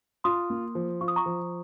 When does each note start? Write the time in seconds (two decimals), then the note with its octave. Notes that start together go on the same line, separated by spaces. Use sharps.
0.24 F4 C6 D#6
0.50 A#3
0.75 F3
1.01 F4 C#6
1.08 D#6
1.16 A#5 C#6
1.26 F3